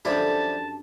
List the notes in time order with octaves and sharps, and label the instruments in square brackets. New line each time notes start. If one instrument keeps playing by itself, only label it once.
[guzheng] F#2 A4 [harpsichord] F3 G3 E4 [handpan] D4 G4 [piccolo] A5